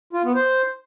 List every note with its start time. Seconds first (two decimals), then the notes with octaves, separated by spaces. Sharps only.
0.13 F4
0.24 B3
0.35 C5